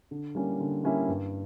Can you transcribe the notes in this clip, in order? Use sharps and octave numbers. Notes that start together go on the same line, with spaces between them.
D3
G3 A#3 C#4 E4
D3
G3 A#3 C#4 E4
G2